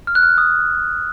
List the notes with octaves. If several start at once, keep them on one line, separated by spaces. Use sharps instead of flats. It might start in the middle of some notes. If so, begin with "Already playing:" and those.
F6
F#6
F6
D#6